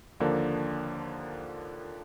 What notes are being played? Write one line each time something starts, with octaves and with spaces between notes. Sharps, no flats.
D#2 D3 F3 A#3 D4